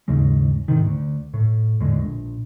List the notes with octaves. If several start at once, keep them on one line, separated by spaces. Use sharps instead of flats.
D#2 G#2 C#3 G#3
G#2 C3 D#3
D2
A2
E2 A2 D3 G#3
A#1